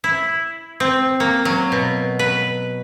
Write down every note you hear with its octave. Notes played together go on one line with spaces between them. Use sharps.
E4
C4
A#3
F#3
B2
B4